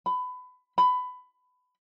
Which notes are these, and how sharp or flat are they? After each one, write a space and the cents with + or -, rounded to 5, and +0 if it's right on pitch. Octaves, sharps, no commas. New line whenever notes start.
B5 +25
B5 +20